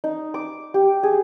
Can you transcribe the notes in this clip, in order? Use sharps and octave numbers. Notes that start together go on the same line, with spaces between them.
D#4
D6
G4
G#4